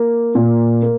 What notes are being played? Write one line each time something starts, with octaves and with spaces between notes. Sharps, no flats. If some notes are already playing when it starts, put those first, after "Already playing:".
Already playing: A#3
A#2
A#3